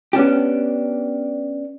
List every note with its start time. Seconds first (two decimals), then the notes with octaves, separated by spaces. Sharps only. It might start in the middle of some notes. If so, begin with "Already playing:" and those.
0.13 B3 C#4 D4 G4